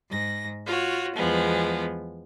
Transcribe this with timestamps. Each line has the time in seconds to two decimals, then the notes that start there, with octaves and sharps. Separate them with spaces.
0.10 G#2 A#6
0.66 F4 F#4 C#5
1.15 E2 F3 G#3 B3